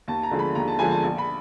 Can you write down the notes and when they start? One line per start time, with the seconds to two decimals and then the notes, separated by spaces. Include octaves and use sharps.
0.08 D#2 A5
0.23 A#5
0.31 D3 F3 G#3
0.39 B5
0.55 D#2 A#5
0.68 A5
0.79 D3 F3 G#3 G#5
0.91 A5
1.03 A#1
1.18 B5